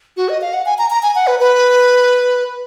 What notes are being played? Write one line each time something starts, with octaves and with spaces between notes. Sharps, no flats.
F#4
D#5
F5
F#5
G#5
A#5
A#5
G#5
F#5
B4
B4